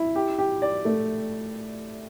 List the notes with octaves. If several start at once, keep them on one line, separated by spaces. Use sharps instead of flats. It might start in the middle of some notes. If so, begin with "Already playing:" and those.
Already playing: E4
G4
G4
D5
A3